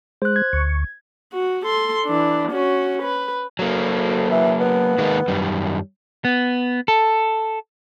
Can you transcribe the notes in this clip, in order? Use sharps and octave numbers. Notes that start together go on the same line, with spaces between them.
G#3 C5 F#6
G#6
D2 C#6
F#4
A4 C6
E3 D4
C#4 F#4
B4
D2 F#3 A#3
E3
B3
D#3 G#3 A#3
F#2 D#3 G3
B3
A4